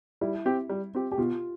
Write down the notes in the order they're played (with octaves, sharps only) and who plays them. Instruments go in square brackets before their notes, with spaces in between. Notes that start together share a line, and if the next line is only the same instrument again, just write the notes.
[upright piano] G3 [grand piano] E4
[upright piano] C4 G4
G3
C4 G4
[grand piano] G4
[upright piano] B2 [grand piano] F4